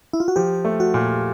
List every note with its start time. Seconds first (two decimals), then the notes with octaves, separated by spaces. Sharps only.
0.13 E4
0.20 F4
0.28 F#4
0.36 F3 G4
0.65 A3
0.80 F#4
0.94 A#2